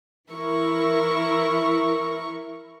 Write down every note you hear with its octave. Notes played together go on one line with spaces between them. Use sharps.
E3 E4 A#4 C#6